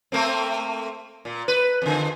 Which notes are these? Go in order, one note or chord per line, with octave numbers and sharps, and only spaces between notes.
A3 A#3 C4
A#2
B4
F2 D3